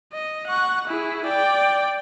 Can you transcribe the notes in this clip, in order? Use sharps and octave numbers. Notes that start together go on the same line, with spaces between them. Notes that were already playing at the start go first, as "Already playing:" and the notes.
D#5
F#5 C#6
E4 G#4
D5 G5